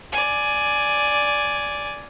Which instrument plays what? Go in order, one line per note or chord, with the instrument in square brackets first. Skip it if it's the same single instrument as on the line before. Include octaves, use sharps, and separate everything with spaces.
[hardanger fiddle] D5 G#5